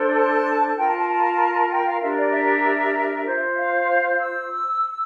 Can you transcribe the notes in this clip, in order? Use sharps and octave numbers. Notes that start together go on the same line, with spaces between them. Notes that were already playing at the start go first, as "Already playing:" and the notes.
Already playing: D4 A4 C5
A5
A5
F4 A#4 G5
A5
A5
A5
G5
F5
D4 G4 A#4 E5
D5
E5
F4 C5
F5
E6